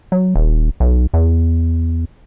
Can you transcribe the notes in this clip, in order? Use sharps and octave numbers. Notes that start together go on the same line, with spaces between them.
F#3
D#1
B1
E2